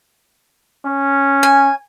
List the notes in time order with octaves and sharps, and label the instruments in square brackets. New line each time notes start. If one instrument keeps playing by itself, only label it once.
[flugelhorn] C#4
[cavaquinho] G#5